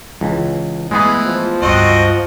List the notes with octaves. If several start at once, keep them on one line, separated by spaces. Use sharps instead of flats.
C#2 E3
E3 G#3 A3 B3 G#4
F3
C#2 G2 C4 F#4 D#5